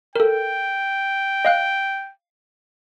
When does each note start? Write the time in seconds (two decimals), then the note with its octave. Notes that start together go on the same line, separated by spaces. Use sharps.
0.16 A4 A#4 G5
1.45 D#5 F5 F#6